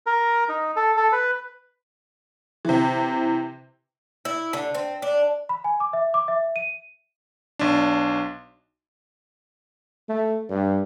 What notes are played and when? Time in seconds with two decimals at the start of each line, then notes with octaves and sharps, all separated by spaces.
0.06 A#4
0.49 D#4
0.76 A4
0.97 A4
1.12 B4
2.65 C3 E3
4.25 E4
4.53 D3
4.75 C4
5.02 D4
5.49 B5
5.64 G#5
5.80 D6
5.93 E5
6.14 D6
6.28 E5
6.56 D#7
7.59 B1 D4
10.09 A3
10.50 G2